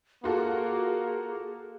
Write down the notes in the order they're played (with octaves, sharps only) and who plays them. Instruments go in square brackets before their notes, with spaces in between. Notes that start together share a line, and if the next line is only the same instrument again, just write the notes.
[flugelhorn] A#3 [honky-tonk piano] F4 F#4 A4 [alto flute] G#4